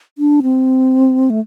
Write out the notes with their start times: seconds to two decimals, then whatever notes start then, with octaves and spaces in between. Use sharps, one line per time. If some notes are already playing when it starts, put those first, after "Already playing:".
0.18 D4
0.43 C4
1.30 A3